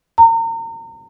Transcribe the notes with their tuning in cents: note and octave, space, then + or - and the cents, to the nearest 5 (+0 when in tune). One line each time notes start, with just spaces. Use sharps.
A#5 -35